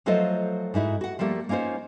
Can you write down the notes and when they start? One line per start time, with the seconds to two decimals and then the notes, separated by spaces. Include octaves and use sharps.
0.06 F3 F#3 A3 F4 C5 D#5
0.74 G#2 D#4 E4 F#4
1.01 F#4 F#5
1.19 F3 G3 A3 A#3
1.49 A#3 C#4 D#4 F4 C5